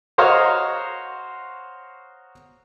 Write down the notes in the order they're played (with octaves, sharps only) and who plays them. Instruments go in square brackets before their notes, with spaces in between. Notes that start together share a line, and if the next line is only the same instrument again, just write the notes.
[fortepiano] F#4 C5 C#5 D#5 F5 A#5